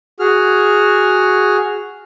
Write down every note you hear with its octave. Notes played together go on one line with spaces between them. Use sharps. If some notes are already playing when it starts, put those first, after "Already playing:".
F#4 G#4 F6